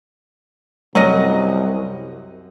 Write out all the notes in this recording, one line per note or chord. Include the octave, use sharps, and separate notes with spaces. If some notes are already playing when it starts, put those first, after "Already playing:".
C2 F#2 F#3 C#4 D#5